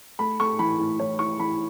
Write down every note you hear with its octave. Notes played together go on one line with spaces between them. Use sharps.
A3 B5
A3 C#6
E3 B5
A2
E3 C#5
E4 C#6
E3 B5